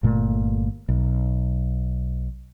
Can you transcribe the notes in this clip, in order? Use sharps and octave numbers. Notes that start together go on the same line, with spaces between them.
G1 A#2 A3
B1